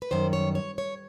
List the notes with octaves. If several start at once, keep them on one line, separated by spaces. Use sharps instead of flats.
B4
F#2 D#3 G3 C5
C#5
C#5
C#5